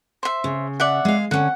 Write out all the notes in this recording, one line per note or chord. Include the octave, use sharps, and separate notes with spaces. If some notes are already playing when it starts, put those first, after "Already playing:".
C5 E5
C#3
D5 E5 F#5
G#3 F5
D3 C#4 F#5